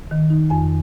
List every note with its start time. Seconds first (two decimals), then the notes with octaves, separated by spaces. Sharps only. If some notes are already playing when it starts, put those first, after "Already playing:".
0.11 D#3
0.30 D#4
0.50 F2 G#5